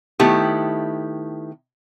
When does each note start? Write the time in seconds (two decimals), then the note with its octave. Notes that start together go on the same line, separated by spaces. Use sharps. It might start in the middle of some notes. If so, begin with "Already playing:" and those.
0.19 D#3 A3 B3 E4 G4